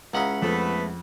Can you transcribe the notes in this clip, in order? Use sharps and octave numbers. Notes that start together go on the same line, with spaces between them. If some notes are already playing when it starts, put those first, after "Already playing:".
C#2 G#3 C#4 E4 F5 F#5 A#5 D#6
F2 A3 B3 B4